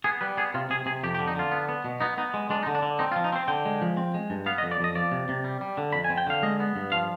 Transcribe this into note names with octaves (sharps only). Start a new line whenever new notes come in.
B3 G#4
G3 B4
B3 G#4
C3 F4
C3 G#4
C3 G#4
F2 G4
G4
D3
D#4
D3 F4
B3
B3
B2
B3 D#4
B3 D#4
G#3
G#3 D4
D#4
D3
D4
D3
C4 D#4
F4
F3
D#4
C4 C5
D3 G5
G#3
F3
C4
G#3
G2
B3 F5
D#5
F2
D5
F2 D#5
F3 D5
C3
C3
G3
G3
D3
F2 B5
G#5
C4
G5
D3 F5
G#3 D#5
B3
G2
F3 F5